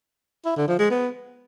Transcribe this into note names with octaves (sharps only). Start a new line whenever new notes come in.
E4
D3
F3
G#3
B3